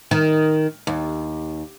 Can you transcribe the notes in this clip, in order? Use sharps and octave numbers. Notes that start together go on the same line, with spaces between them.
D#3
D#2